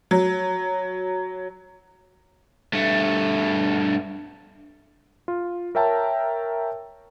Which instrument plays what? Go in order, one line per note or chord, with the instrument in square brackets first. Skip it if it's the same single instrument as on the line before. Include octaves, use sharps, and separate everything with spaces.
[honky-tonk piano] F#3
[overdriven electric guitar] G2 A3
[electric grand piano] F4
A#4 C#5 E5 G5 A5 A#5